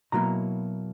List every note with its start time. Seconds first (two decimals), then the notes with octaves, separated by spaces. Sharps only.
0.12 B2 F#3 A#3 E4 A#5